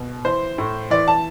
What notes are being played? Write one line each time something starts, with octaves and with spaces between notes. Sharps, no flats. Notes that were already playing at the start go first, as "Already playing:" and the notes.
Already playing: B2
E3 C5
A2
E3 D5
A5